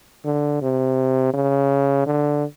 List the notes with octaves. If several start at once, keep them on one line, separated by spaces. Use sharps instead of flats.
D3
C3
C#3
D3